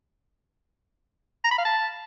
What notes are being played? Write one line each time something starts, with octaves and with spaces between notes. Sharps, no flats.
A#5
B5
F5
A5